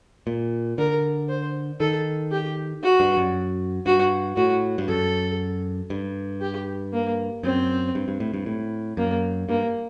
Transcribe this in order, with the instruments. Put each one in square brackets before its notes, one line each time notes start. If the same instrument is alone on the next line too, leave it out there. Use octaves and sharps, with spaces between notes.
[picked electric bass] A#2
[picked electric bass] D3 [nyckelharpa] A#4
[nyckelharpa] C5
[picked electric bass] D#3 [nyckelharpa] A4
[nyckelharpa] G4
F#4
[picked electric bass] G2
F#2
[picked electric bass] G2 [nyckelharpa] F#4
[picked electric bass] A2 [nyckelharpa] F#4
[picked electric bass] G2
[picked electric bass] F#2 [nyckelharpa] A4
[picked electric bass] G2
[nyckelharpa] G4
A#3
[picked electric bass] F#2 [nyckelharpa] C4
[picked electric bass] G2
G2
A2
G2
A2
[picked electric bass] F#2 [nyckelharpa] A#3
[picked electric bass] G2 [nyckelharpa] A#3